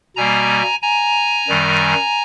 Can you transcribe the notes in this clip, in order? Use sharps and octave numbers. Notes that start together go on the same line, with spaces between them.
B2 G3 A#3 G#5 A#5
G#5 A#5
F#2 D#3 G3